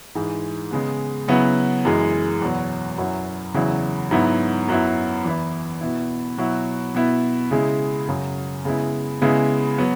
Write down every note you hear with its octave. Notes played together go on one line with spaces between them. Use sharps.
G#2 E3 G#3
C#3 G#3 B3
C#3 F#3 B3 E4
F#2 E3 G#3
E2 B2 F#3
F#2 F#3 C#4 E4
E2 C#3 F#3 E4
G#2 F#3 B3 E4
F#2 F#3 B3 E4
E2 E3 B3 E4
B2 B3 E4
B2 F#3 E4
B2 B3 E4
C#3 G#3 E4
F#2 C#3 F#3
C#3 G#3 B3 E4
C#3 G#3 B3 E4
F#3 B3